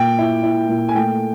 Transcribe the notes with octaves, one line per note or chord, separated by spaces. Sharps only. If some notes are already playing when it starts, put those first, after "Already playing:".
Already playing: A#2 G5
E4
E4
A#2
G#5
A3 G5